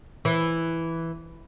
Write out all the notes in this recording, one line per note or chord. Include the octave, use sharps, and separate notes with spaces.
E3